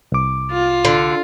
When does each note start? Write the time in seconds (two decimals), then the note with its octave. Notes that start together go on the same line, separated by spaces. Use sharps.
0.12 C2 D6
0.51 F4
0.85 D3